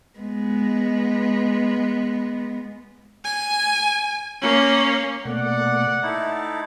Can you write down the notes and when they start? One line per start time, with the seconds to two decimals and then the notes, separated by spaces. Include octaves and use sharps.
0.19 G#3 B3
3.25 G#5
4.41 A#3 C#4
5.25 B2 A3 A#3 D5 F#5
6.03 A3 D#4 E4 A5